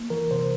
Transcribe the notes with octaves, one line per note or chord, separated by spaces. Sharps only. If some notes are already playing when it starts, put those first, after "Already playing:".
Already playing: A#3
E3 A#4
C3 C5